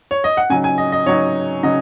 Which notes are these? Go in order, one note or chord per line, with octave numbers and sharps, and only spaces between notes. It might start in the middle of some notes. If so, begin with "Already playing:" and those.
C#5
D#5
F#5
C#3 F#3 D#4 G#5
G#5
D#5
D#5
C#3 F#3 D#4 C#5
C#3 F#3 D#4 D#5